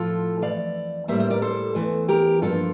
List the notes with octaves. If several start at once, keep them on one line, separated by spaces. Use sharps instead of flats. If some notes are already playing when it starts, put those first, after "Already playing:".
Already playing: A2 F3 A3 F4 A4
F2 E3 A3 D5 F5
A2 G3 A#3 C5 E5
C5 E5
A#4 D5
A4 C5
E2 E3 A3
G4 A#4
G2 F3 A#3 F4 A4